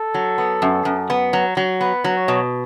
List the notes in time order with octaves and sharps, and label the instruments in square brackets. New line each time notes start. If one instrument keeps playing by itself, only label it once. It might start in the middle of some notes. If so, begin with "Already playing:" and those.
Already playing: [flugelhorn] A4
[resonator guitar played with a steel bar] F#3
B3
F#2
F#2
B3
F#3
F#3
[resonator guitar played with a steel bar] B3 [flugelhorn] B4
[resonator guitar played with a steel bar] F#3
[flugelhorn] C#5
[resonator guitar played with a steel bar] B2